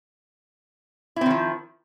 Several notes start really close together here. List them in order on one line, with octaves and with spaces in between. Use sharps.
E4 C4 D#3 F3